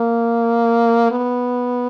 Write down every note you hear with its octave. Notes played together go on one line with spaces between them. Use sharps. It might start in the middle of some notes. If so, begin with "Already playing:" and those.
Already playing: A#3
B3